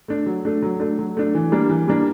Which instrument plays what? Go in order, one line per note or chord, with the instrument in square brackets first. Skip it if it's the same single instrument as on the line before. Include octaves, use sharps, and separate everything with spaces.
[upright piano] A3 D4
F#3
A3 D4
F#3
A3 D4
F#3
A3 D4
E3
G3 A#3 D4
E3
G3 A#3 D4